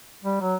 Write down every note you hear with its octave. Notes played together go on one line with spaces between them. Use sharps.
G3
F#3